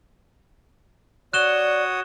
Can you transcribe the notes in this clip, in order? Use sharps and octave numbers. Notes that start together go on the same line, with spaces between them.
F#4 C#5 D5 D#6 F#6 E7 G7